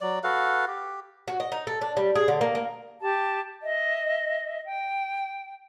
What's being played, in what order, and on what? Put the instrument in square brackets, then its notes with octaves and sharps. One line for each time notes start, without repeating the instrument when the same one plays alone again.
[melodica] F#3 D5
F#4 A4 B4 F5
G4
[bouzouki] F#4
D#5
D#4
A4
D4
G3
G#4
D3
A#3
A#3
[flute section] G4 A5
D#5 E5
G5